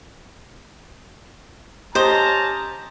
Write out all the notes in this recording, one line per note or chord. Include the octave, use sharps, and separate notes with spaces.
C#4 G4 C5 D#5 A5 A#5